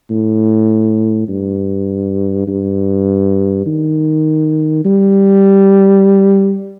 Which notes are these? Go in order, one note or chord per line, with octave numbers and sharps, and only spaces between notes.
A2
G2
G2
D#3
G3